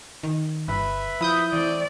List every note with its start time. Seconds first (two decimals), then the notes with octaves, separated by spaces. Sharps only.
0.23 D#3
0.68 G1 B4 E5 B5
1.21 F3 E4 D#6 G6
1.53 E3 A3 C4 D5